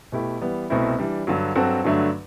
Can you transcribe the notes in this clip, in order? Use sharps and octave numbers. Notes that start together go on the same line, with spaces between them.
B2 A3 E4 G4
E3 G3 B3
C2 B2 A3 C4 E4
E3 G3 D4
G2 D3 F#3
G2 F#3 C4 F#4 A4
G2 D3 F#3 A3 D4